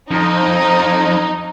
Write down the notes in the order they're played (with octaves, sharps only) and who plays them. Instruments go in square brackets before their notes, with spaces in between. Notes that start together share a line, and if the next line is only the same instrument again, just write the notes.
[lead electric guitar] F2 [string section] D#4